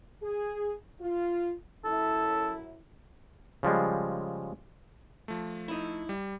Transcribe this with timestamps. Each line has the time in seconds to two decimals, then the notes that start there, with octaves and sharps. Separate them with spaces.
0.22 G#4
1.00 F4
1.85 F#2 E4 A4
3.63 C#3 F3 G3 G#3
5.28 F3 A3
5.68 D#4 E4
6.09 G3